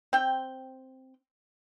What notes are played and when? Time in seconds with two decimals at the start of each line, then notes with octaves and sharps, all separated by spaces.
0.13 C4 G5